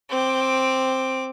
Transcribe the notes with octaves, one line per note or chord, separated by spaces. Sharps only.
C4 D6